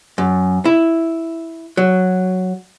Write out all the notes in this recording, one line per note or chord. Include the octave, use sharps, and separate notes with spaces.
F#2
E4
F#3